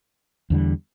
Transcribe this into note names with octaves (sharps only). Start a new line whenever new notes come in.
E2 D3 G3